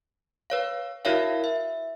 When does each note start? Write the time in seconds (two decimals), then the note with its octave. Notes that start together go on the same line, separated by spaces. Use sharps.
0.50 B4 C#5 F5
1.05 E4 F#4 A#4 C#5 E5 F5
1.44 E5